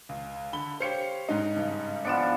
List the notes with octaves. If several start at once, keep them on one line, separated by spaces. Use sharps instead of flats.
C#2
D3 B5 G7
G4 C5 C#5 F5 C#7
G#2 D#4
G2 C#3
F3 B3 D4 C#7 D7 E7